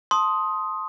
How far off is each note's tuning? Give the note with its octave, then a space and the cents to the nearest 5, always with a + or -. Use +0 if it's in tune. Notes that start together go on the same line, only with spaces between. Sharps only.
A5 +0 C6 +5 D#6 +10